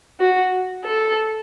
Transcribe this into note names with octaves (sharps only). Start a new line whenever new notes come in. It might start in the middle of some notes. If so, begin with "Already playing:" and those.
F#4
A4